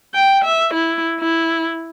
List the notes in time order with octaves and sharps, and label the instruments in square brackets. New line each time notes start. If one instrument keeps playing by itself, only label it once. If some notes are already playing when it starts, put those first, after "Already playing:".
[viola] G5
E5
E4
E4